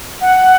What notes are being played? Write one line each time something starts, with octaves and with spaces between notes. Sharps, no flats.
F#5